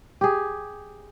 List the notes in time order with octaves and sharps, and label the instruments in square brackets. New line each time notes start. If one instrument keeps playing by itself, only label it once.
[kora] G4 G#4